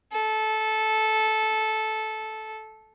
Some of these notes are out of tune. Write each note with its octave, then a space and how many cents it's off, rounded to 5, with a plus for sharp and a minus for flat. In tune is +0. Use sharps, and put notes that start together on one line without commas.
A4 -15